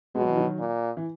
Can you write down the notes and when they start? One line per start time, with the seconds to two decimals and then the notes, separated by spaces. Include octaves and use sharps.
0.15 B2 G#3
0.21 F#3
0.29 E3
0.37 D#3 F#3
0.59 A#2
0.97 E3